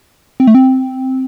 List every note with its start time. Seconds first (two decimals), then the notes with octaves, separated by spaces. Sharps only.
0.40 C4
0.47 A3
0.55 C4